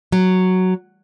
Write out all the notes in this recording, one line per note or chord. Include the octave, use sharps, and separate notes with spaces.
F#3